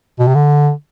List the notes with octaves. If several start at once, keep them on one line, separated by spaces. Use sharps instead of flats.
B2
C3
D3